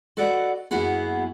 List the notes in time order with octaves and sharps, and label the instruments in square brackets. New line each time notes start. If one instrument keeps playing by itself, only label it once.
[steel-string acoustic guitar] F#4 A4 B4 D5 D#5 F#5
F#2 A#3 B3 E4 F#4 G#4